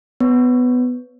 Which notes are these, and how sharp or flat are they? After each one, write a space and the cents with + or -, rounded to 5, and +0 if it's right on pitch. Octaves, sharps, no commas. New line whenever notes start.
B3 +10 C#5 +0